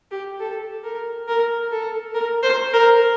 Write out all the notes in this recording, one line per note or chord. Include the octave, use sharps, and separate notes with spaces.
G4
A4
A#4
A#4
A4
A#4
C5
A#4